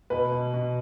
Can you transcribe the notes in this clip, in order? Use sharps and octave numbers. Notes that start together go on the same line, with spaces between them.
B2 B4
B2
B2